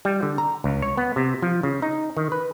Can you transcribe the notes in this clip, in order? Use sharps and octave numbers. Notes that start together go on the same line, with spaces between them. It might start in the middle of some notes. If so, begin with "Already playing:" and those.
G3
D3
A#5
C#2
C#5
B3
C3
F3
C#3
D#4
D#3
B4